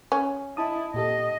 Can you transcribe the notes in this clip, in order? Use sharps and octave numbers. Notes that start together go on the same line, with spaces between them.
C#4
E4 D#5 A5 D#6
A#2 G4 A4 D#5